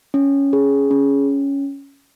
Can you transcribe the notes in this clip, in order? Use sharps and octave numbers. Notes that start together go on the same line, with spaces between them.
C#4
G#4
C#4